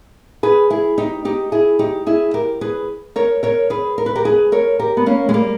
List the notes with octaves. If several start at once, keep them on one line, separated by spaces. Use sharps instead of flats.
G#4 B4
E4 G#4
D#4 G4
D#4 G4
E4 G#4
D#4 G4
E4 G#4
G4 A#4
G#4 B4
A#4 C#5
A#4 C#5
G#4 B4
A#4
B4
G4 A#4
G#4 B4
A#4 C#5
G4 A#4
B3
A#3 C#4
G#3
G3 A#3